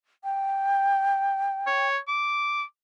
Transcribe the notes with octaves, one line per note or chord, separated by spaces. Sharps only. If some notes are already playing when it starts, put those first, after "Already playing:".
G5
C#5
D6